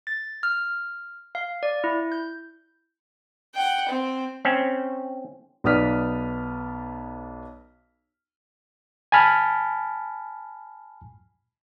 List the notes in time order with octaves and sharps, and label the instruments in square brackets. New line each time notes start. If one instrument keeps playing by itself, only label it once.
[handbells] A6
F6
F5
D5
E4
G6
[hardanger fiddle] F#5 G5
C4
[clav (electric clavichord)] C4 C#4
[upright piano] B1 B3 D5 D#6 F6 B6
[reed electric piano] G#5 A5 B5 F6